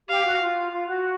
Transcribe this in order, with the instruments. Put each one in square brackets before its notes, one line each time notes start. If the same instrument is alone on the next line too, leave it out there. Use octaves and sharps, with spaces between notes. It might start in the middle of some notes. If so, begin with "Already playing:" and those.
[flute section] G4 [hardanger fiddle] F5
[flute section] F#4
F4
F4
F#4